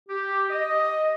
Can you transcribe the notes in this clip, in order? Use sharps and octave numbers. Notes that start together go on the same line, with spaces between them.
G4
D#5